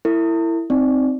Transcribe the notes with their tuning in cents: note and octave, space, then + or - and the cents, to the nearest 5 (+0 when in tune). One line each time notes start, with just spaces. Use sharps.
E4 +10 A#4 -45
C4 +0 D#4 +0 D5 +0